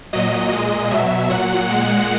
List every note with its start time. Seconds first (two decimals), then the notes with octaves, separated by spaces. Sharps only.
0.13 A#2 F#3 D#5
0.52 A#2 G#3
0.91 B2 F#3 E5
1.29 A#2 F#3 F#5
1.69 A#2 G#3